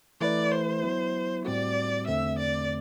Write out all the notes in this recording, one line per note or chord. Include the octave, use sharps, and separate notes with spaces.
E3 A3 E4 B4 D5
C5
F#3 B3 E4
A2 G3 C4 F#4 D5
E2 D3 A3 C4 E5
D5